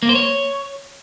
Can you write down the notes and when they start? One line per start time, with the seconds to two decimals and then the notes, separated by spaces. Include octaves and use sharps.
0.03 A#3
0.09 C5
0.15 C#5